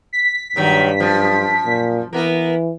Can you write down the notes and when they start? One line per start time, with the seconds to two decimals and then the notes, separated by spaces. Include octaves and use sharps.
0.13 B6
0.56 G2 A#2 D#3 F#3
1.00 F#2 F3
1.66 A#2
2.13 E3 A#3 B3 A#4